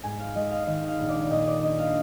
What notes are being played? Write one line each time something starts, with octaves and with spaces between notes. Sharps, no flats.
G#2 G#5
F5
G#3 D#5
F5
D#3 D#5
F5
A#1
D5
A#2 D#5
D5
D4 D#5
F5